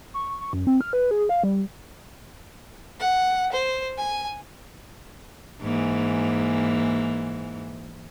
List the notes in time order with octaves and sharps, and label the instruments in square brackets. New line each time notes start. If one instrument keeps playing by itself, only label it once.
[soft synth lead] C#6
C#6
F#2
C4
F6
B4
G#4
F5
G3
[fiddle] F#5
C5
G#5
[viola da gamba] G#2 E3 A#3